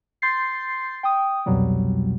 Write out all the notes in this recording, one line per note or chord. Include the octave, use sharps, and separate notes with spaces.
C6 G6 A6 C7
G5 D#6
C2 F2 B2 F#3 G3